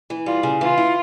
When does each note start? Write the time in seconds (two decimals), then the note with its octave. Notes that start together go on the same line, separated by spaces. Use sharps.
0.10 E3
0.26 G3 F4
0.43 C#3
0.61 E3 F4
0.78 E4